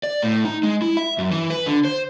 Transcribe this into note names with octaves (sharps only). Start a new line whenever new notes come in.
D5
A2
D#4
G#3
E4
E5
F#2
E3
B4
D3
C5